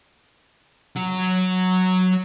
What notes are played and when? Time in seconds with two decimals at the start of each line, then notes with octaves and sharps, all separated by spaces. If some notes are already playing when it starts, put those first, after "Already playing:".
0.96 F#3 F#4